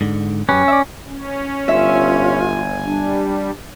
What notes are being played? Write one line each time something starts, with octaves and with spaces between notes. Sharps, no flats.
G#2 D3
F#2 C#4 G4 B4
D5 E5
C#4
G1 F4 E5 G#5
G3 D4